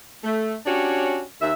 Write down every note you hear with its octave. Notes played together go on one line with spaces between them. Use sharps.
A3
C#4 D4 F#4 G4 C#5
D#2 E5